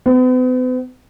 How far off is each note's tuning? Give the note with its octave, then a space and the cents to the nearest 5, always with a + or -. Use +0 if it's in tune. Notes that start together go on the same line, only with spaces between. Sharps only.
B3 +45